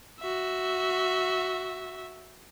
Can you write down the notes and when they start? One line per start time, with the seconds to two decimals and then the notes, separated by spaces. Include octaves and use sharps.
0.20 F#4 E5